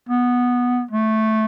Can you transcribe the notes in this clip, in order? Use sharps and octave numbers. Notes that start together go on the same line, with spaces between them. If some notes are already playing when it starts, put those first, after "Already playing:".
B3
A3